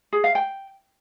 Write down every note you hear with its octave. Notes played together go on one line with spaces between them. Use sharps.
G#4
F5
G5